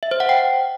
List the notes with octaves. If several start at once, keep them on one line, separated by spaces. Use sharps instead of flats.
E5
C5
F#5
G5